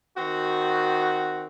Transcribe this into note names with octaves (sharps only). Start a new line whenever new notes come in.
D#3 C4 F#4